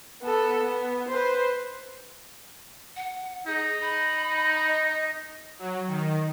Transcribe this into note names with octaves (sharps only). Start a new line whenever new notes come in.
B3 A4
B3
B4 C5
F#5
D#4 G#4
B5
D#5
F#3
D#3